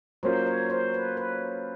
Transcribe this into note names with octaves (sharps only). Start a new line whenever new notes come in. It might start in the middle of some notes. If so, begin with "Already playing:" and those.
F#3 A#3 C#4 F4 C5
C#5
C5
B4
B4